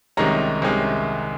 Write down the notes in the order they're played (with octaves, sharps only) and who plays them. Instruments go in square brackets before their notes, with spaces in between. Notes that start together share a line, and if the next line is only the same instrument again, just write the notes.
[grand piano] C2 C3 D#3 G#3 C#4 A#5
C2 C3 D#3 G#3 C#4